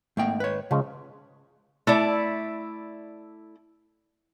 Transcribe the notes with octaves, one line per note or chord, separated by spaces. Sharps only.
G#1 A3 A#3 G5
B4 C#5
C#3 F3 G#3 C#4
A3 E4 D5